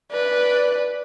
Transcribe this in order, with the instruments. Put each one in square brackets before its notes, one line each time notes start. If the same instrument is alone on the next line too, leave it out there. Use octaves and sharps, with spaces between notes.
[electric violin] B4 [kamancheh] D5